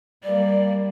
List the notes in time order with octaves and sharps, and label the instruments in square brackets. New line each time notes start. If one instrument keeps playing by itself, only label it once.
[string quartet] G3 A#3 [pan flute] D5